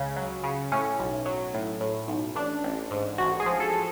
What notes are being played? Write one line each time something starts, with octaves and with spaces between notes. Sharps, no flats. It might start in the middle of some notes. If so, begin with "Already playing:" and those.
Already playing: C#2 C#3
F#3
C#3
A2 C#4
B1
F#3
A2
A2
B1
A1 D4
A1
G#2
A1 F#4
G#4
F3
A4